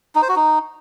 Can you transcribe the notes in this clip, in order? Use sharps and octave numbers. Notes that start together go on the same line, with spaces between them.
D#4
C5
F#4
D#4